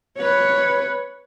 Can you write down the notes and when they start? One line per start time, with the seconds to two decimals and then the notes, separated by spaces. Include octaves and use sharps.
0.18 B4 C#5